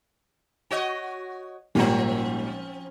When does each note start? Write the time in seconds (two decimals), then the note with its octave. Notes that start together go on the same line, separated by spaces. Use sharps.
0.70 F#4 C#5 D#5
1.75 G#1 A#2 F3 G3 C4 C#4